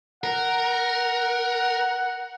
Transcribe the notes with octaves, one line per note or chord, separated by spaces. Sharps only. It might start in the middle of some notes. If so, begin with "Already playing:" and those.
A#4 F#5